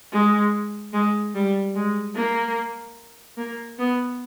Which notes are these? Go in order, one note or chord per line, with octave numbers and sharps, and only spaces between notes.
G#3
G#3
G3
G#3
A#3
A#3
B3